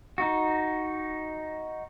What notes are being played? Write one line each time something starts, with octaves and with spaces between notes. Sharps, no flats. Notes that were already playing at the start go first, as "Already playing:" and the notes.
D#4 F#4